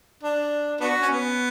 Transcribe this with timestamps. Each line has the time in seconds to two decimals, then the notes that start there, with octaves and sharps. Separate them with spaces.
0.23 D4
0.80 B3 D4 F#4
1.02 C#4
1.09 B3